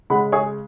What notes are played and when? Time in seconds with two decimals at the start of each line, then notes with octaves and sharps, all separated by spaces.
0.10 C#3 G#3 F#5 B5
0.32 G#4 C#5